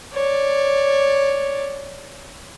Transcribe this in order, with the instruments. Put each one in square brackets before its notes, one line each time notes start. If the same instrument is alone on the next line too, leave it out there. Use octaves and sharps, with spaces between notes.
[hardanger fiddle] C#5 D5